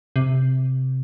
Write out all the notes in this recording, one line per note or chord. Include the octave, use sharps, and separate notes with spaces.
C3